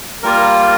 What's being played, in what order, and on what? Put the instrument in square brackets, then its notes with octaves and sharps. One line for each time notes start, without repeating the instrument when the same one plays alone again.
[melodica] G3 A#3 F4 A#4